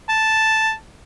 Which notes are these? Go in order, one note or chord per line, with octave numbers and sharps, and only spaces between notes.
A5